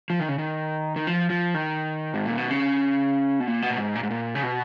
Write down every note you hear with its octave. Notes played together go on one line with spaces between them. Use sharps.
F3
D#3
C#3
D#3
D#3
F3
F3
D#3
G#2
A#2
B2
C#3
B2
A#2
B2
A#2
G#2
A#2
G#2
A#2
C#3
B2